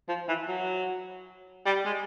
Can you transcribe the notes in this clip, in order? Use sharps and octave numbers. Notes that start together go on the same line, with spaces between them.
F3
E3
F#3
G3
G#3